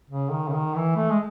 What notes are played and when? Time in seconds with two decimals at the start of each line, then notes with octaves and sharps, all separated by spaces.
0.10 C#3
0.31 D#3
0.48 C#3
0.53 D#3
0.75 E3
0.96 A3
1.10 G#3